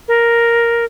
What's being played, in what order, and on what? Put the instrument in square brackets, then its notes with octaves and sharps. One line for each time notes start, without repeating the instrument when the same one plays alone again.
[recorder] A#4